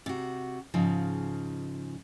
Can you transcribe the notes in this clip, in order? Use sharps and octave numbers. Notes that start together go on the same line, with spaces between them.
C3 F#4
G#2 C#3 F3